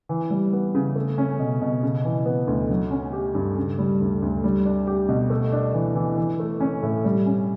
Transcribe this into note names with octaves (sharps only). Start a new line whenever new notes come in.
E3
G3
B3
C#3
A3
C#4
B2
B2
C#3
E3
B3
D2
F#3
C#4
G4
G2
C#3
G3
D2
D2
G3
D4
G4
B2
A3
D4
E3
E3
E3
A3
C#4
A2
G3
C#4